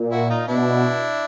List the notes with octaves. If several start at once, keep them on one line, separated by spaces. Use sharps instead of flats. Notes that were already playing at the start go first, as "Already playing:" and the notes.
Already playing: A#2
E4 F#4
D#4 F4
B2 D4 E4